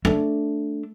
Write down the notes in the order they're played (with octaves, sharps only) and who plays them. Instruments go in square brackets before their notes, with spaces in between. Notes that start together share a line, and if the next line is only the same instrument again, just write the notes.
[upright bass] A3 D4